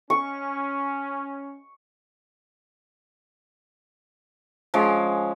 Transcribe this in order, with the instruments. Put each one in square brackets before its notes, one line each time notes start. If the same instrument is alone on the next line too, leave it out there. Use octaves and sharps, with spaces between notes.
[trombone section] C#4 [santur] C#6
[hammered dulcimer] F3 G#3 C#4